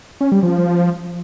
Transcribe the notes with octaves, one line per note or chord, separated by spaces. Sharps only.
C#4
G3
F3